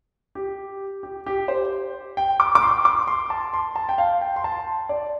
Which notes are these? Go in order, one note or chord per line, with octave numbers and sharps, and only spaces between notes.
G4
G4
G4
C5
G5
D6
D6
C6
D6
C6
A5
C6
A5
G5
F5
G5
C6
A5
D5